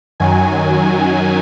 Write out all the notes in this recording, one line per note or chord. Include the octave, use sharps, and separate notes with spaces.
F#2 D#3 F#3 G#5